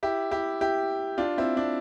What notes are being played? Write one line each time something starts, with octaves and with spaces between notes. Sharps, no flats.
E4 G4
E4 G4
E4 G4
D4 F4
C4 E4
D4